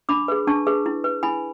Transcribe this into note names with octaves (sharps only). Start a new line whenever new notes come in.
D4 B5 D6
G#4 B4
D4 A5 C#6
G#4 B4
E4
B4
E4 G#5 B5